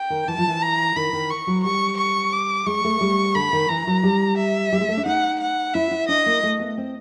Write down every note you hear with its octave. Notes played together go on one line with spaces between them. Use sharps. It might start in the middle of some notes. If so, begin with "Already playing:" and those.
Already playing: G5
D#3
E3 A5
F3
E3
A#5
D#3 B5
D#3
C#6
F#3
G3 C#6
C#6
D6
G#3 C#6
A3
G3
D3 B5
D#3
E3 A#5
F#3
G3
E5
G3
G#3
A3
D4
D#4 F#5
F#5
E4 E5
E4
D4 D#5
A#3
A3
B3
C4